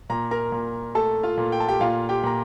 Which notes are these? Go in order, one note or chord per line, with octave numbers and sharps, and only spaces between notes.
A#2 A#5
A#4 A#5
A#2
A3 A4 A5
F4 F5
A#2
G5
A5
G4 G5
A#2 F4 F5
G4 G5
A#2 A#5